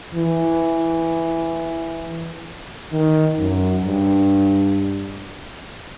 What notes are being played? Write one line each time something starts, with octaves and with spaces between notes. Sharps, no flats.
E3
D#3
F#2
G2